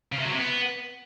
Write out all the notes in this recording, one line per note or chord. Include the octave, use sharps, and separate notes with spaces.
C#3
C3
F#3
C3
B3